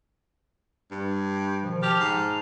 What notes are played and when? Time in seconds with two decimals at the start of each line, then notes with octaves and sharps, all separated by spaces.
0.91 G2
1.63 B2 D#3 F3
1.83 G4 A5 F6
2.00 G#2